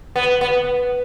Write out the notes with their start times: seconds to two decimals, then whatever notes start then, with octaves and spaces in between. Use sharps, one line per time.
0.16 B3
0.41 B3